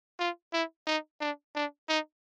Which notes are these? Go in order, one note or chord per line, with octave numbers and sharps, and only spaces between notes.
F4
E4
D#4
D4
D4
D#4